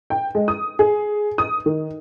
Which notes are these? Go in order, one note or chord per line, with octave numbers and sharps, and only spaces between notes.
G5
G#3
D#6
G#4
D#6
D#3